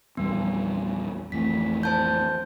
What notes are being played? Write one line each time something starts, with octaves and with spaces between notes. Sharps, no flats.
A#1 E2 G3 B3
A1 F2 A2 B6
C5 A5 G6